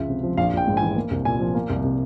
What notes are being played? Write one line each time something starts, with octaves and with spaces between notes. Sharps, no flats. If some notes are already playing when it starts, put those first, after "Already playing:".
Already playing: C#2 F3 G#3 E5
C3
F3
A#1 F5
A#1 G5
G#2
G#5
E3
A#3
C2
A#2 G#5
F3
A#3
C2
C3